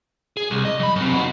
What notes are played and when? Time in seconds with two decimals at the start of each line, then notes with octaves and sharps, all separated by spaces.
0.37 G#4
0.51 C2
0.65 D#5
0.80 F#3 B5
0.96 F#2 C3
1.14 D#4 F#4